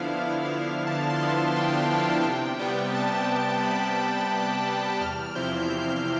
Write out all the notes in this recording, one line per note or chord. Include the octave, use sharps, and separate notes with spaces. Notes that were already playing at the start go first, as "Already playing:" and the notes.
Already playing: D3 F3 B3 E4 F5
D3
F3 B3 E4
D3 A5
C6
F3 B3 E4
D3 G5
F3 B3 E4
C3
G3 B3
C3 A5
G3 B3
C3 B5
G3 B3
C3
G3 B3
E2 F6
F6
C3 F3 C4 E4 G6
E2 G6
C3